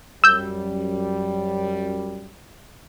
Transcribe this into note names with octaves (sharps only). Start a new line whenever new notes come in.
F#2 G3 E6 G6